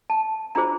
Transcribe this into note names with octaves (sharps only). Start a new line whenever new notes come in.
A5
D4 F4 G#4 C5 A#5